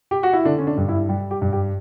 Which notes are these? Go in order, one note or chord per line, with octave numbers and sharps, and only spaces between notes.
G4
F#4
E4
D3 D4
C#4
D4
G2
E4
G3
G4
G2
G4